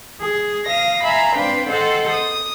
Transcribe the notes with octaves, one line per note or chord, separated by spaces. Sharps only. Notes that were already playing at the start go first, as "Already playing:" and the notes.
G#4
F5 D#6 A#6
E5 F5 G#5 A#5 B5
C4 D4 B4 F5 G5
A4 C5 D#5 F#5 G5
D#6